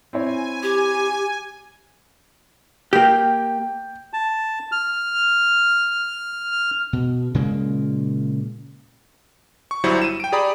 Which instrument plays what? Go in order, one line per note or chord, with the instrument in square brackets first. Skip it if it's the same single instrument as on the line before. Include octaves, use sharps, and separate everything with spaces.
[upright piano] C4 E4 C#5 [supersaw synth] G#5
[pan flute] G4
[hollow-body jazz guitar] A#3 G4 [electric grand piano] G5
[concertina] A5
F6
[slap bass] B2
A#2 C#3 G#3 A#3
[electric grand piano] C#6
G1 F#3 G3 E4 C5 C#7
D#7 E7
G5 D7
G4 G#4 D5 A#5 B5 D#6